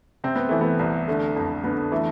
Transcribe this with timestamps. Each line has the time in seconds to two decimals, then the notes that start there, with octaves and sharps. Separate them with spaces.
0.24 C3 C4
0.35 B3
0.49 E3 A3
0.61 B3
0.79 C2
1.08 D3 A3
1.36 F2
1.64 D3 B3
1.92 E3 A3